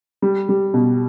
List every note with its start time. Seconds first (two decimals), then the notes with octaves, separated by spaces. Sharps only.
0.22 G3
0.49 G3
0.74 B2